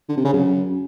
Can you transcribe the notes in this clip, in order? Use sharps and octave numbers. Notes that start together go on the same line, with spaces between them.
D3
C3
C#3
F#2